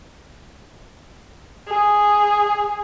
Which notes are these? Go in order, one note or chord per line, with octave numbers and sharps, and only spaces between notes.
G#4